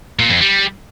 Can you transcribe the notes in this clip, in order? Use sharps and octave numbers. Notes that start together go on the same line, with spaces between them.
A#2
F2
G3